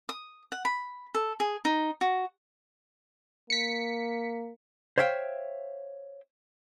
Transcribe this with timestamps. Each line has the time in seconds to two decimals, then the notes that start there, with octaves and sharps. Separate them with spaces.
0.09 D#6
0.52 F#5
0.65 B5
1.15 A4
1.40 G#4
1.65 D#4
2.01 F#4
3.50 A#3 B6 C#7
4.98 C5 C#5 E5 F5 G5